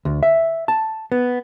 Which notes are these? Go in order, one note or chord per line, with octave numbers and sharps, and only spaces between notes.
D2
E5
A5
B3